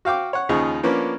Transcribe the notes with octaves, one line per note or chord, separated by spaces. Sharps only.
F#4 F5 G5 D6
C#5 F#5
D#2 C#3 F3 D#4 G#4 C#6
F3 A#3 B3 C#4 D4